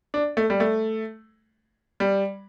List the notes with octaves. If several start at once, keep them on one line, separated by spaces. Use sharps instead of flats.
D4
A3
G3
A3
G3